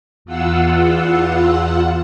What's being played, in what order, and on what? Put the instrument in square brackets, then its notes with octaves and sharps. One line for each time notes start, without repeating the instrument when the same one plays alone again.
[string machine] E2 F4 F#5 E6